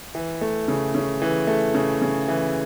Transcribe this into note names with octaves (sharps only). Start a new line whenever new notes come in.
E3
A3
C#3
C#3
E3
A3
C#3
C#3
E3